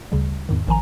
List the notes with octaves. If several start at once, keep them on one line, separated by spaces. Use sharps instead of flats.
D2 C#3 G3
E2 G#2 D#3
A1 D#3 F3 G#5 A#5